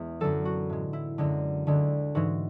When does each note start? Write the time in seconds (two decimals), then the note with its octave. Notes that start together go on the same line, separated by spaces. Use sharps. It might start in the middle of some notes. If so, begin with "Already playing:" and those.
Already playing: E2 G#3
0.20 F#2 D3 F#3 A4
0.45 F#4
0.70 A2 G#3
0.93 E4
1.18 F#2 D3 G#3
1.67 D2 D3 G#3
2.15 G#2 E3 G#3 F#4